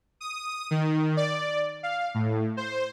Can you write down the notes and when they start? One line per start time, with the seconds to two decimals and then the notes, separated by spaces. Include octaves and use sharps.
0.21 D#6
0.71 D#3
1.17 D5
1.83 F5
2.15 A2
2.57 C5